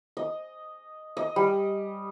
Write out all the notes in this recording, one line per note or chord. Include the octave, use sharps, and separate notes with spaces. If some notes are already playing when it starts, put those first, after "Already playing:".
D#5
D#5
G3